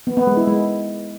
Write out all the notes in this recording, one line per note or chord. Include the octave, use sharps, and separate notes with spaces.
B3
B3
G#3
E4
G#3